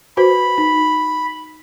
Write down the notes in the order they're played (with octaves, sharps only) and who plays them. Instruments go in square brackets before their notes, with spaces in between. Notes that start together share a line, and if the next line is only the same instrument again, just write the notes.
[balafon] F#4 B4 C5 [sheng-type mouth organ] B5
[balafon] D#4